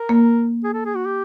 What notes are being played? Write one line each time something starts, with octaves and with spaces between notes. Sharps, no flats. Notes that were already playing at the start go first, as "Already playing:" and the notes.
Already playing: A#4
A#3
G#4
A4
G#4
F#4
G4